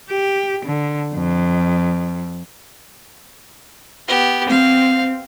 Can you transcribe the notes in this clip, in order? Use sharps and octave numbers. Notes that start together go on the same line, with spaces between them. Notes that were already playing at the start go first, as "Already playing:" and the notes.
G4
D3
F2
B3 G4
C4 F5